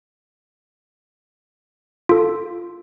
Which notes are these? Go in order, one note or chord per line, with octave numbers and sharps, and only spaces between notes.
F4 A4